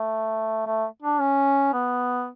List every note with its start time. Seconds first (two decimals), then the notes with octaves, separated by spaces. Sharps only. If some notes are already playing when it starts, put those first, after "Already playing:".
Already playing: A3
0.66 A3
1.02 D4
1.20 C#4
1.73 B3